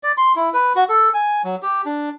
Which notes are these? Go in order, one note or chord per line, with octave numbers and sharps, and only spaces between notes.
D5
C6
E4
B4
F#4
A4
G#5
F#3
G4
D4